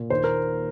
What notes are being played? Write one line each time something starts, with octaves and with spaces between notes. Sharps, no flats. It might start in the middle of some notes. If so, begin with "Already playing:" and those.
Already playing: A#2
D#2 C5
A#4